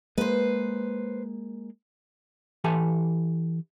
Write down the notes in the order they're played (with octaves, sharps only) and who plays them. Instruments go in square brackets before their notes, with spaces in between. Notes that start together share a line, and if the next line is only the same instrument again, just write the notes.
[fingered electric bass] G#3 A#3 [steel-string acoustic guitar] B4 C5
[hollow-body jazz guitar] E3 G4 A4 G#5 A5